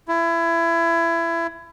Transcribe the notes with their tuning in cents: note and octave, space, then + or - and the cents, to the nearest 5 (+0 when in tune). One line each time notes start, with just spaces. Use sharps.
E4 +25